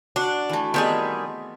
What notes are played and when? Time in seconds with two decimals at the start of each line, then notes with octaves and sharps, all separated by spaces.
0.16 D4 F#4
0.49 E3 A3
0.74 D#3 G3 B3 C4 G#4 E5